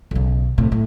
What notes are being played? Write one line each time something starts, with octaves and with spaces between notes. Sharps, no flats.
B1 C#3
A2 C3
A2